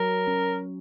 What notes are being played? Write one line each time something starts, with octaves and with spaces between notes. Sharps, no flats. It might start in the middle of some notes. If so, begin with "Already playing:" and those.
Already playing: F#3 A#4
C#4